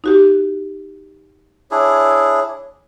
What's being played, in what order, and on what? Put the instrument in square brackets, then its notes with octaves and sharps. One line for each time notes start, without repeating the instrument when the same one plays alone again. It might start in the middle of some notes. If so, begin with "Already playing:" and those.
[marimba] D#4 F#4 G4
[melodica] D4 E4 G#4 [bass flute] C#5